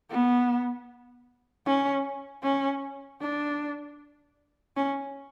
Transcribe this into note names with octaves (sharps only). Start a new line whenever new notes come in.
B3
C#4
C#4
D4
C#4